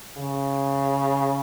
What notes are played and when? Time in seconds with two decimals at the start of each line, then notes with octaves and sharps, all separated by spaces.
0.17 C#3